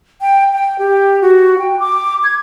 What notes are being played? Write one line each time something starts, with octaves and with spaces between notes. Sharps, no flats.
G5
G5
G4
F#4
G5
D6
G#6